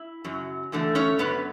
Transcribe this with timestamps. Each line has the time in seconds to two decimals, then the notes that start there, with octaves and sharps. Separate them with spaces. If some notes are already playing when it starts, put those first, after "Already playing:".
Already playing: E4
0.24 F#2 C#3 F#3
0.72 E2 D3 A3
0.95 C#4 C#5
1.19 F#2 D3 F#3 B3 B4